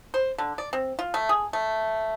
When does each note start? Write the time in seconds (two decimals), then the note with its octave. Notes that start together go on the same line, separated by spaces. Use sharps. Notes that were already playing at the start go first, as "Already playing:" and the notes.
0.14 C5
0.38 D3
0.58 D5
0.73 C4
0.99 F4
1.14 A3
1.29 G#4
1.53 A3